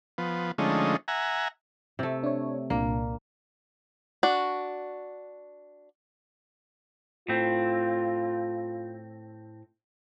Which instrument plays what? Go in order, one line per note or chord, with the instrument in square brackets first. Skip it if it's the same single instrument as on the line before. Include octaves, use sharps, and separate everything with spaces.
[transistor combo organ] F3 B3
D3 F3 G#3 A3 C#4 D#4
E5 F#5 G#5 A#5
[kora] C3 A3
[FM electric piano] D4 C#5
[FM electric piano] C2 A#2 D4 [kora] A#3
[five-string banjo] D4 F#4
[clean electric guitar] A2 C4 [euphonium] F4